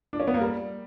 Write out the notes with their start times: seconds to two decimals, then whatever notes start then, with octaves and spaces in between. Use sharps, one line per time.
0.13 D4
0.20 C#4
0.27 B3
0.34 A#3
0.41 G3